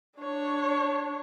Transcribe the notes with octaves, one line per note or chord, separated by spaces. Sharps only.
D4 C#5